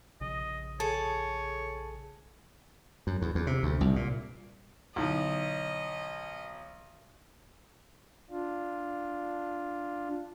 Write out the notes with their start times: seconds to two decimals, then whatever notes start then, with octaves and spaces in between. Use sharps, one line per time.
0.21 A#1 C#3 D#5
0.80 G#4 A4 C#5 A5
3.07 F#2
3.22 E2
3.35 E2
3.47 C3
3.63 D2
3.81 C2
3.96 A#2
4.96 B1 D3 D#4 E4 D#5
8.31 D4 F4